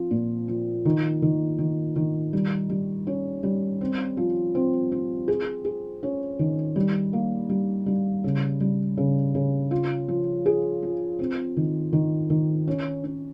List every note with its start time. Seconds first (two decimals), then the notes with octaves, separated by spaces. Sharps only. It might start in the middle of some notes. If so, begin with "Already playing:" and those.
Already playing: F3 C4
0.11 A#2
0.48 F3
0.85 D#3
1.22 D#3
1.58 D#3
1.96 D#3
2.33 G3
2.70 G3
3.07 C#4
3.43 G3
3.81 C4
4.17 F3
4.55 C4
4.92 C4
5.28 G#4
5.65 G#4
6.03 C#4
6.39 D#3
6.76 G3
7.13 A#3
7.49 G3
7.86 G3
8.24 C#3
8.61 G3
8.97 C#3
9.35 C#3
9.71 F4
10.08 F3
10.46 G#4
10.83 F3
11.19 C4
11.57 D#3
11.93 D#3
12.30 D#3
12.68 C#4
13.04 C#4